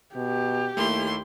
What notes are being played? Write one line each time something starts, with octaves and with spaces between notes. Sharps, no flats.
B2 G4
D#2 A3 A#3 E4 C6